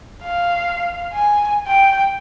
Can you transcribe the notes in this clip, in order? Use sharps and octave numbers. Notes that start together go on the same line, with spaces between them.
F5
G#5
G5